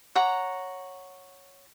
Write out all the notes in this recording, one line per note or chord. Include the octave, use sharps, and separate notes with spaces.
C#5 F#5 A#5